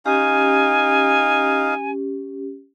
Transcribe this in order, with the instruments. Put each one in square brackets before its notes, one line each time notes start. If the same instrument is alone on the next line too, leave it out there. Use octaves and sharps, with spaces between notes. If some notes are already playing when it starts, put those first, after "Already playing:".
[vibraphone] C#4 G4 [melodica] D#4 F5 [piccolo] G#5